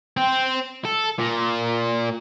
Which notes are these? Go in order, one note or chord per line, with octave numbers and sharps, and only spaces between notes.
C4
A4
A#2